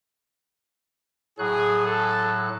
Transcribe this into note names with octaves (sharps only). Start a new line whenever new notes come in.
A2 F#3 G#4 F#6
A4